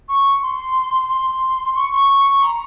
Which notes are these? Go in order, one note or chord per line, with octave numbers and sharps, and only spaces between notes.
C#6
C6
C6
C#6
C#6
A#5